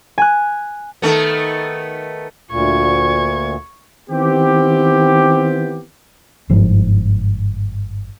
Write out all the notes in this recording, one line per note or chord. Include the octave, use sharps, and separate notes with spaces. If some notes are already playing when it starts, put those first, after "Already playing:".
G#5 F#6
D#3 A3 B3
D2 A#2 C#6 G#6
D#3 E3 B3 C4 G4
G1 G#2 F3